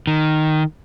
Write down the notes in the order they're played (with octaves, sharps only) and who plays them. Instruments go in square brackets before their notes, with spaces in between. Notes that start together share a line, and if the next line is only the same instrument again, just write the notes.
[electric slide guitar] D#3